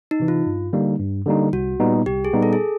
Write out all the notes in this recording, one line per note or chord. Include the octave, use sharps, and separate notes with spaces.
D#4
C3 E3
F4
G2
D3 G3 A#3 D#4
G2
D3 G3 A#3 D#4
C2 F#4
A#2 G3 B3 D#4
C2 G4
G#4
A#2 G3 B3 D#4
A4
G#4